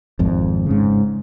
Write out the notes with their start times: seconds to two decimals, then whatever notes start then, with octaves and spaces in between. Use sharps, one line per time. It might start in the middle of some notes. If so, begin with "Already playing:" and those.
0.19 G#1 F2
0.66 G#2 C#3